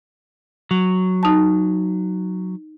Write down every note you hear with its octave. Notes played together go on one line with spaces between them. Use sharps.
F#3
D#4 A5